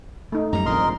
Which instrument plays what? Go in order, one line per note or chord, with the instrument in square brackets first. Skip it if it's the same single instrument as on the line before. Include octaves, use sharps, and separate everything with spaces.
[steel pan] A3 D#4
[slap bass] F#2 G3 [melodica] A#5
[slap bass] A#1 F2 G#2 [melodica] A#4 D#5 C6